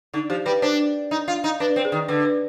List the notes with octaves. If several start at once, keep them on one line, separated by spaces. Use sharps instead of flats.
D3 D#4
F3 G4
G3 B4
D4 C5
D#4
F4
D#4
D4 B4
C4
G#4
D#3
D3 B4
B4